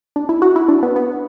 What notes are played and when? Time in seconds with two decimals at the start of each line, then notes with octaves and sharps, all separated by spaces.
0.16 D4
0.29 E4
0.42 F#4
0.56 E4
0.69 D4
0.83 B3
0.96 B3